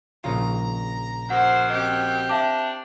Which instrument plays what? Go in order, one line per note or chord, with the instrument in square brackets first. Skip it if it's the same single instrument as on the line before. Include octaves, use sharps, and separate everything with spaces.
[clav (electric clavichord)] A#1 C#3 F4 [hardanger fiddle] A#5
[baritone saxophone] F#2 [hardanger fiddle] C5 [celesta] F#5
[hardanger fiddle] C4 G4 [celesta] D#5
[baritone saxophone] D4 [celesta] E5 F5 D6